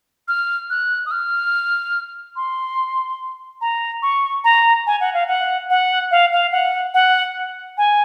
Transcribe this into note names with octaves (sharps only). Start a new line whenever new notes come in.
F6
F#6
D#6
F6
C6
A#5
C#6
A#5
G#5
F#5
F5
F#5
F#5
F5
F5
F#5
F#5
G#5